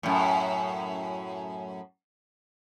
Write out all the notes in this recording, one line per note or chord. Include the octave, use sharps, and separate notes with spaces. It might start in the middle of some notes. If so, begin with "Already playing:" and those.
F#2 A2